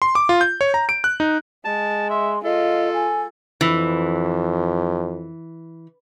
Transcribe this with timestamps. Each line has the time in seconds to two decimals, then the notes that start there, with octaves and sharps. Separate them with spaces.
0.02 C6
0.15 D6
0.29 F4
0.41 G6
0.61 C#5
0.74 A#5
0.89 D7
1.04 F#6
1.20 D#4
1.65 G#3 A5
2.10 E5 C6
2.44 F4 A4 D#5
2.94 G#5
3.61 F2 E3